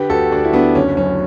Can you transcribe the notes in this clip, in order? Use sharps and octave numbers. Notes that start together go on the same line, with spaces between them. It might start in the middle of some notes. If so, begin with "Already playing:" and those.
Already playing: D3 G4 B4
D2 F#4 A4
D2 D4 F#4
E4
D3 B3 D4
F#1 C#4
F#2 C#4